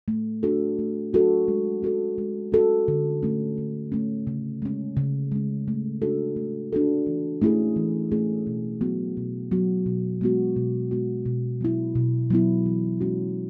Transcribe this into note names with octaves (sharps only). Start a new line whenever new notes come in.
A3
D4 F#4 A4
A3
D4 F#4 A4
G#3
C#4 F#4 A4
G#3
C#4 F#4 A4
D3
A3 C#4
D3
A3 C#4
C#3
G#3 C#4
C#3
G#3 C#4
A3
D4 F#4 A4
A3
D4 F#4 A4
E3
A3 C#4 E4 G#4
E3
A3 C#4 E4 G#4
B2
F#3 B3 F#4
B2
F#3 B3 F#4
B2
G#3 B3 F#4
B2
G#3 B3 F#4
B2
F#3 B3 E4
B2
F#3 B3 E4
E3
G#3 C#4 F#4